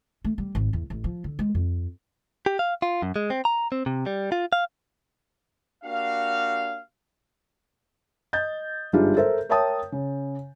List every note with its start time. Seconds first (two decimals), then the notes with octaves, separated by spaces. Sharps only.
0.25 A3
0.38 G3
0.55 G#1
0.73 E2
0.90 A1
1.04 F3
1.24 D3
1.39 G#3
1.55 F2
2.46 G4
2.59 F5
2.82 F4
3.02 F#2
3.16 G#3
3.30 C4
3.45 A#5
3.72 C4
3.86 C3
4.06 G3
4.32 F4
4.53 F5
5.84 A#3 D4 F#4 G4 F5
8.33 D#5 G6 A6
8.93 G1 G#2 G3 D4 F4 G#4
9.16 A4 A#4 C5 E5
9.49 A#4 C#5 E5 G5 A5 D#6
9.92 C#3